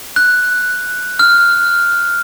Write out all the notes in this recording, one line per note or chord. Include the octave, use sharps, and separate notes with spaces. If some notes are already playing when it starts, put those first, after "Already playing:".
F#6
F6